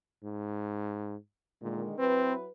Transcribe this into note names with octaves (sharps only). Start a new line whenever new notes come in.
G#2
A#2 D3 D#3 G#3
F#3 C4 E4 B4